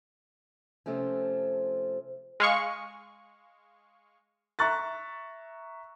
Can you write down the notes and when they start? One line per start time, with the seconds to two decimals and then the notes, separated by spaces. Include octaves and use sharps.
0.86 C3 F3 A3 C4 C#4
2.40 G#3 F5 C#6
4.59 E5 A#5 C#6 F#6 A6